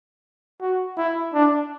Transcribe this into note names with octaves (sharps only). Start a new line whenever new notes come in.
F#4
E4
D4